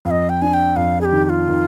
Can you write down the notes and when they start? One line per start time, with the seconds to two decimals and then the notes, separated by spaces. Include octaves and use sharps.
0.05 F2 F5
0.11 D#5
0.29 G5
0.42 D4 G#5
0.53 G5
0.76 F2 F5
1.01 G#4
1.05 G4
1.13 D#3
1.24 G4
1.29 F4
1.48 D#3